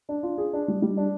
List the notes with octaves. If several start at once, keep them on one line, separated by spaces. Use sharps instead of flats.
D4
F4
G#4
D4
G3
G3
D4